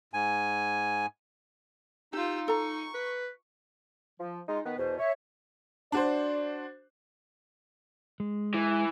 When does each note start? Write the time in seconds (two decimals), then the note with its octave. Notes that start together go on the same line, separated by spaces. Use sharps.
0.13 G#2 G#5
2.13 D#4 F4 G4 E6
2.48 A4 A#5 C#6
2.94 B4
4.19 F3
4.48 G#3 D#4 F4
4.65 D#3 B3 B4
4.78 E2 B2 C5
4.99 C#5 E5
5.92 D4 F#4 C5 D5
8.20 G#3
8.54 E3